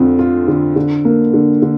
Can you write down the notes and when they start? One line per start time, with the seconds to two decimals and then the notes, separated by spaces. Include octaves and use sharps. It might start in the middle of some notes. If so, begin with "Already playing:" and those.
Already playing: F2 D3 F4
0.19 F4
0.48 D3
0.76 D3
1.05 A#3
1.34 D3
1.62 D3